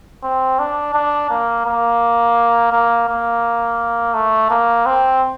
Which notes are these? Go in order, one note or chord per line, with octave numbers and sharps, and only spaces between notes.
C4
D4
D4
A#3
A#3
A#3
A#3
A3
A#3
C4